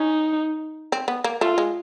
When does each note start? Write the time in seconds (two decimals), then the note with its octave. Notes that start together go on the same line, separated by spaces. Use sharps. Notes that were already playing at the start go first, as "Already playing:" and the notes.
Already playing: C#4 D#4
0.92 C4
1.08 B3
1.24 A#3
1.41 A3 F4
1.58 G#3